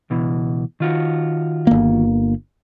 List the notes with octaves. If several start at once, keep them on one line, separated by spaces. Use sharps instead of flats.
C#2 B2 E3
D#3 F4 F#4
G1 A#3